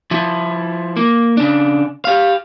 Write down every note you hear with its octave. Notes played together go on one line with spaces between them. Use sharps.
F3 E4
A#3
C#3 D4
G4 F5